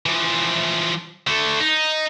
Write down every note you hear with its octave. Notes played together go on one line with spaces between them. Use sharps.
E3 F3
D3 A3
D#4